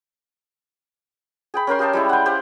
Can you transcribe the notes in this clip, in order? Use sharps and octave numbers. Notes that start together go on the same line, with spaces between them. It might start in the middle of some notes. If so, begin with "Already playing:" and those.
G#4 G5 B5
C#4 A#4 G5 C6
G4 D#5 F5 A5
G3 G#3 E4
F#5 G5
G4 C5 F5 G5